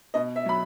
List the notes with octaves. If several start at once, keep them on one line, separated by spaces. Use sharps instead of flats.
B2 D#5
E5
F#3 B5